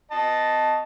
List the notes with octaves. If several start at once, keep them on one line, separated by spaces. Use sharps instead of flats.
D#5 A5